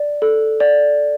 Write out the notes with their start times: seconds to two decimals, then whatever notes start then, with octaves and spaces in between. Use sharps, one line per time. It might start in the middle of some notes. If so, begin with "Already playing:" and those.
Already playing: D5
0.22 A4
0.60 D5